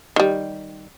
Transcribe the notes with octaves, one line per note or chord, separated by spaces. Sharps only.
D#3 G3